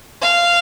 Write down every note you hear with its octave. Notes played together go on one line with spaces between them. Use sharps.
F5